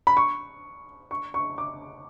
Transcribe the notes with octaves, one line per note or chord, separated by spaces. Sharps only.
B5
C#6
C#6
C#6
D6